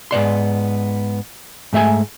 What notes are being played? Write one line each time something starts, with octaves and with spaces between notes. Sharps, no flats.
G#2 B3 D5 C6
G#2 A3 E5 G#5